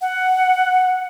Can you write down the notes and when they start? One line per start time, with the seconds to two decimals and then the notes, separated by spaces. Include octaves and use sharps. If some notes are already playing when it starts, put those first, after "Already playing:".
0.01 F#5